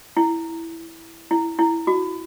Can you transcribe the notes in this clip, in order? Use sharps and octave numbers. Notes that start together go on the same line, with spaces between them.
E4
E4
E4
F#4